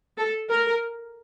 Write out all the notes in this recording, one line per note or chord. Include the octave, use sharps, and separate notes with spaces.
A4
A#4